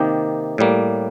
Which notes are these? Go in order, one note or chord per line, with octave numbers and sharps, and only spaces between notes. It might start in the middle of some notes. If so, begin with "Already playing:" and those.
Already playing: C3 D#3 A#3 D#4 G4
A2 G3 A#3